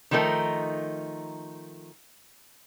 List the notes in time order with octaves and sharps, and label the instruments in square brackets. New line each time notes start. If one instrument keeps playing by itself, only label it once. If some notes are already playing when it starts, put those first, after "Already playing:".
[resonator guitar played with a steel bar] D#3 F3 A3 D#4 A#4